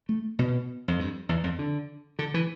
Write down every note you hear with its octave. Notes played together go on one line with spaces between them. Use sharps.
A3
B2
F2
G2
E2
F2
D3
D3
E3